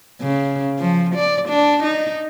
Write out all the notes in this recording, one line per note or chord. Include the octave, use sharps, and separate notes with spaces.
C#3
F3
D5
D4
D#4